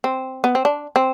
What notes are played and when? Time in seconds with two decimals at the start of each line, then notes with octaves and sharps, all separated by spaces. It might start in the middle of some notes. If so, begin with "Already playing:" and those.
0.04 C4
0.44 B3
0.55 C4
0.65 D4
0.96 C4